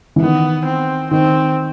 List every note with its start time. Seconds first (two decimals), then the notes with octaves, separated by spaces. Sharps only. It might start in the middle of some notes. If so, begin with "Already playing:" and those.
0.16 E3
0.21 D#3 B3
0.66 C4
1.11 D#3 C4